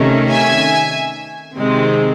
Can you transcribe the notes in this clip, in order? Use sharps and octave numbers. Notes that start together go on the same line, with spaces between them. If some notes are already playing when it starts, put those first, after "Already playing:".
Already playing: C3 D#3 A3 C#4
E5 G#5
C3 D#3 G#3 C4